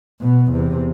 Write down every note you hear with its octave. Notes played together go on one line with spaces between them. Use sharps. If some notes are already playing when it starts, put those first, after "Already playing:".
B2 B3
E2 C3